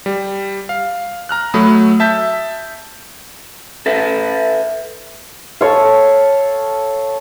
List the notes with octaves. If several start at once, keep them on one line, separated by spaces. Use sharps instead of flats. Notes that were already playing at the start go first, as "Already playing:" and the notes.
G3
F5
A#5 F6 F#6
F#3 A3 B5 D#6
E5 A5 G6 B6
A4 B4 E5
A4 C#5 F5